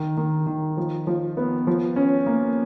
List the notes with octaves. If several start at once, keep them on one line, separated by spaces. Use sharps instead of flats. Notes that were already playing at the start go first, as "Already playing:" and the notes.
Already playing: D#3
D#3
D#3
F3
F3
B3
F3
C#4
A#3